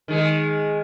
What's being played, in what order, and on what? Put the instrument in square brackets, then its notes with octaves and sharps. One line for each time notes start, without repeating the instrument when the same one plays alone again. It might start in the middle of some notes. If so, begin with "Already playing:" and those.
[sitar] D#3 G#3